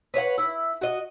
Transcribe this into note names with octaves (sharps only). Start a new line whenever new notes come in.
B4 C#5 D#5 F#5
E4
F#4 D#5